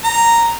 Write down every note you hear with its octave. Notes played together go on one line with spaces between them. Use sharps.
A#5